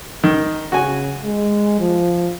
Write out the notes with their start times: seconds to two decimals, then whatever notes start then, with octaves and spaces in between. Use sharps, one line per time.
0.24 D#3
0.72 C#3 F#4 G#5
1.22 G#3
1.80 F3